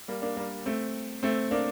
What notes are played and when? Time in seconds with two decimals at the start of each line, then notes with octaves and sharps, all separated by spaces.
0.08 G3 A#3
0.22 A#3 D4
0.37 G3 A#3
0.66 A3 C4
1.23 A3 C4
1.51 A#3 D4